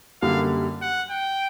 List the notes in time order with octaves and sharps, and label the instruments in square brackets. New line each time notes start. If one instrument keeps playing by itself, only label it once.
[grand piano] F#2 D3 G3 A#3 [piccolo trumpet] F5
[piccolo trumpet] F#5
G5